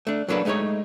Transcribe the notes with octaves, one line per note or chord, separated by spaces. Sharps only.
A3 D4
F#3 A#3 D4 A4 B4
G#3 A3 D4 D#4 C#5